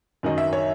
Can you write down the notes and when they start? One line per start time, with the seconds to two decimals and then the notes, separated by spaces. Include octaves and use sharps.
0.23 F#2 D#3 F#3 D#5
0.38 E5
0.53 C#5